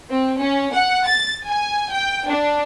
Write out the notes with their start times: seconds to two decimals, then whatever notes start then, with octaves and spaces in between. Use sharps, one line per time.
0.10 C4
0.40 C#4
0.74 F#5
1.06 A6
1.46 G#5
1.92 G5
2.29 D4